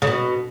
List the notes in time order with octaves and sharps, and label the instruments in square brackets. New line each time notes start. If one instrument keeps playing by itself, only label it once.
[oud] C#3
B2